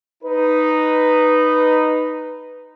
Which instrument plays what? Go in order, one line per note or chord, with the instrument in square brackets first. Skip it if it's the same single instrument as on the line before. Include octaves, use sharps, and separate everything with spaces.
[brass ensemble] D#4 B4